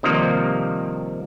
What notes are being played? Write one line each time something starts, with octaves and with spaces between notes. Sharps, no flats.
C3 D#3 F3 G3 A#3